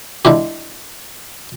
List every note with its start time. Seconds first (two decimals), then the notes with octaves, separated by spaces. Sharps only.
0.25 D3 G#3 E4 G4